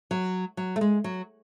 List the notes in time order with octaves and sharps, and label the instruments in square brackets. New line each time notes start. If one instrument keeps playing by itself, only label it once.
[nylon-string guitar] F#3
F#3
A3
G#3
F#3